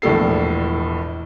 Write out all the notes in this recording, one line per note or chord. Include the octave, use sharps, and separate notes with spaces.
E1 A#1 A2 A4 C7